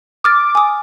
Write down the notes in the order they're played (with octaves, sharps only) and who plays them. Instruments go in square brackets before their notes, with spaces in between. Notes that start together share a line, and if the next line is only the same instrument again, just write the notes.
[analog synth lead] D6 [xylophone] D#6 F6 A6
[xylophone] G#5 D#6